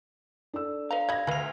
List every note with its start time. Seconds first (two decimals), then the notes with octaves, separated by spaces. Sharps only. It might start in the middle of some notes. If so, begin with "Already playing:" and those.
0.54 D4 A4 E6
0.91 B4 C5 D#5 F5 A#5
1.09 G3 D#5 B5 G#6 A#6
1.27 D2 B4 B5 F7